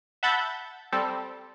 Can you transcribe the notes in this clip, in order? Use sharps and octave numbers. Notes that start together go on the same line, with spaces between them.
E5 F#5 A5 B5 G6 A6
G3 C4 A4